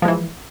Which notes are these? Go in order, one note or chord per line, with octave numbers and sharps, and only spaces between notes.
E3 F3 G#3